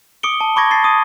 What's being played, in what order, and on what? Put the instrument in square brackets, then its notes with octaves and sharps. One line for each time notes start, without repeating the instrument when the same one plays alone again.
[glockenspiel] D6 D#6 C#7 D7 G7
A5
B5 C#6 D6 G#6 A#6
A5 A6 C7
D#6 D#7